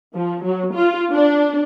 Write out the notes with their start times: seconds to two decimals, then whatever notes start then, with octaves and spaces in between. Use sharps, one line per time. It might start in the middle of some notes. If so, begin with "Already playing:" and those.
0.15 F3
0.44 F#3
0.74 F4
1.12 D4